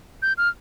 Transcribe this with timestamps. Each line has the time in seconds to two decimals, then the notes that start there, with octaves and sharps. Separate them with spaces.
0.22 G6
0.38 F6